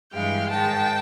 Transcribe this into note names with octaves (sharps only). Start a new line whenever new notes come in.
G2 E3 G#3 F5 G5
G#2 D#3 G#3 G5 A5